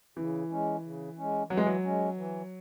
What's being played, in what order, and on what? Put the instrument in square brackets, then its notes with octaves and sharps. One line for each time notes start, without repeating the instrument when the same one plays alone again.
[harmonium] C#3 [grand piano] E3
[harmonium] G#3 C#4
C#3
G#3 C#4
[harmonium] E3 [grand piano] F#3
[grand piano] G#3
F#3
[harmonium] G#3 C#4
E3